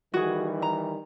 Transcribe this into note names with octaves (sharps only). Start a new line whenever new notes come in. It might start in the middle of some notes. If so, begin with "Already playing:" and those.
D#3 E3 G3 F#4 G#4
A#5